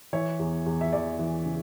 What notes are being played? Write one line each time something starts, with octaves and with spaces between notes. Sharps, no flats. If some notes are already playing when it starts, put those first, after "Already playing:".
E3 C#5 E5
E2
E2
E5
E2 D5
E3
C#3